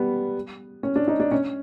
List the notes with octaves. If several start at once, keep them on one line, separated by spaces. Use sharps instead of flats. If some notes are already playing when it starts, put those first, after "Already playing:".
Already playing: G3 B3
C#4
D4
D#4
D4
C#4